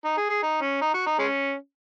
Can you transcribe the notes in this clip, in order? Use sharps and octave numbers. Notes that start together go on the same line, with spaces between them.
D#4
G#4
G#4
D#4
C#4
D#4
F#4
D#4
G#3 C#4